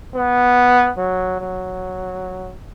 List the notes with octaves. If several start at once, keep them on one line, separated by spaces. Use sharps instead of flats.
B3
F#3
F#3